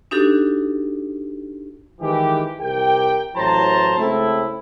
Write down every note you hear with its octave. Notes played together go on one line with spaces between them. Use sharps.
D4 D#4 F#4 G4 A4
D#3 E3 G#3 G4
C2 G4 A#4 G5
A1 E3 F#3 C5 A5 A#5
C#2 A3 C4 E4